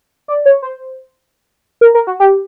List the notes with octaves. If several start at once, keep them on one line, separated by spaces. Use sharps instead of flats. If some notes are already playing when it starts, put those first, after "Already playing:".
D5
C#5
C5
A#4
A#4
F#4
G4